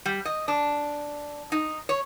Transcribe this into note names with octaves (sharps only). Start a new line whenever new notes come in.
G3
D#5
D4
D#4
C#5